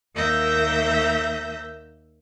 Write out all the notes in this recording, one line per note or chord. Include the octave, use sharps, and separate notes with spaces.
D#2 A#3 E5 E6 G6 A#6